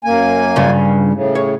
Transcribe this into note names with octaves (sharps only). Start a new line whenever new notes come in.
F#2 A#3 G#5
G2 C#3 F4
A2 C#3
C#5